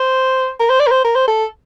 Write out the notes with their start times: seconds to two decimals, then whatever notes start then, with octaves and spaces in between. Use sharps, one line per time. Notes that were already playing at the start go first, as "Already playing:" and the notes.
Already playing: C5
0.60 A#4
0.70 C5
0.80 D5
0.87 A#4
0.91 C5
1.04 A#4
1.15 C5
1.28 A4